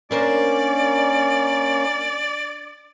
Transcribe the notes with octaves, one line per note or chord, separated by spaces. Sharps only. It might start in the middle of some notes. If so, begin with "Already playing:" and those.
A#3 C#4 D4 A#4 C5 D5